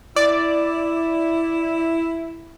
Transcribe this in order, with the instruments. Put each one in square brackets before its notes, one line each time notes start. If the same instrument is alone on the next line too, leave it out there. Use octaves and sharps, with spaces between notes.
[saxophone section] E4 [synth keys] D5